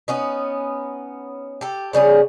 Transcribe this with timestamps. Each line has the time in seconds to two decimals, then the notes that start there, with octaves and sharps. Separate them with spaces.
0.08 B3 C#4 D#4
1.61 G4 A4
1.93 C#3 G3 C#4 G#4